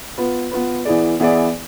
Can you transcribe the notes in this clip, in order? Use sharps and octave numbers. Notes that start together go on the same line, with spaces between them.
B3 F4 B4
B3 F4 B4
E3 B3 E4 G#4 D5
E3 B3 E4 G#4 D5